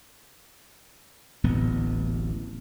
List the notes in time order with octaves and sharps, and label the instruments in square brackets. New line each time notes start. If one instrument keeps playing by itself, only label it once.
[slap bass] D1 A1 B3